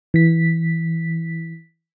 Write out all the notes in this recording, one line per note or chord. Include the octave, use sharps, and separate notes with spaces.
E3 B6